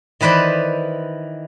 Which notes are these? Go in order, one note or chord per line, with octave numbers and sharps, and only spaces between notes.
D#3 E3 B4 C5 D5